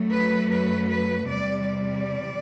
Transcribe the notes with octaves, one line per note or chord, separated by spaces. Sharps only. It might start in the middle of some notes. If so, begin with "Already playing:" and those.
Already playing: F#2 F#3 A3
B4
B4
B4
E2 C3 G3 D5
D5